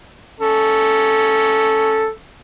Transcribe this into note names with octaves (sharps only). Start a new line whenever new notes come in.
C#4 A4